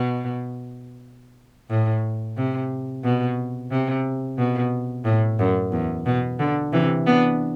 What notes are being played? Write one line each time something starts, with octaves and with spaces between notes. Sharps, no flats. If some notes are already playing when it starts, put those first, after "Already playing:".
Already playing: B2
A2
C3
B2
C3
B2
A2
F#2
E2
B2
D3
C3 E3
B3 D4